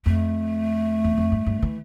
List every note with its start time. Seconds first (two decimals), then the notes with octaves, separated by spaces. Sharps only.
0.06 F2 A3
1.04 E2
1.18 F2
1.32 G2
1.46 G2
1.62 E3